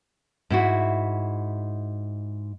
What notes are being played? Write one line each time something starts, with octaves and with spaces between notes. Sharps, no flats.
G#2 E4 F#4